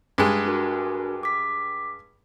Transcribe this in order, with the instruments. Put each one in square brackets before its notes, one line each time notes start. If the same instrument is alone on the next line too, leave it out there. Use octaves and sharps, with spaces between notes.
[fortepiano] G2 G#3
[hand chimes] D4 F#4 A#4
D6 B6